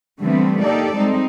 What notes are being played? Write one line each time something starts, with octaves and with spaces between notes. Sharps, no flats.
D3 E3 G3 A3 B3 C4
A#3 D#4 G4 A4 D5
G3 G#3 C4 D#4